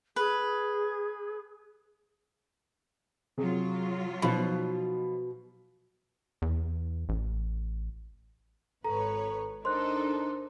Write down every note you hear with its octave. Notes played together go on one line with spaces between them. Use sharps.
G#4 B4
C3 F#3 F4 G#4
B2 F3 D#4 B5
E2
A1
G#1 A4 B4 C#5 A#5
D4 D#4 A4 A#4 C5 C6 F#6